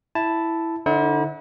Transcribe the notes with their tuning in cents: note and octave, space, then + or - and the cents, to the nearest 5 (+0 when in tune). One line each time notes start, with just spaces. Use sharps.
E4 +0 A5 +0
D3 +5 E4 -45 C5 +0